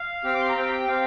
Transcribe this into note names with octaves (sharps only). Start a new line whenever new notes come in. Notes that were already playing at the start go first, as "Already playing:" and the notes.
Already playing: F5
C4 G4 F6
D6
C6
A#5
C4 G4 G5
C4 G4 F5